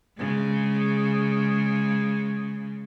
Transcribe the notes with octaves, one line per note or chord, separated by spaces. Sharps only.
C#3 G#3